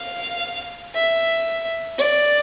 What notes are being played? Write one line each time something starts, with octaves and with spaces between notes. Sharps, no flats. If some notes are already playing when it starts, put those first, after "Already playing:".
Already playing: F5
E5
D5